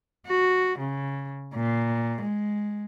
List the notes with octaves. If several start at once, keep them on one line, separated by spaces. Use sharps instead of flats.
F#4
C#3
A#2
G#3